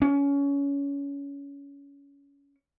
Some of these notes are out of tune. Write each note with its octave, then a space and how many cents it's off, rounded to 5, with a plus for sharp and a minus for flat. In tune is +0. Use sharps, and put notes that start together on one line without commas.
C#4 +25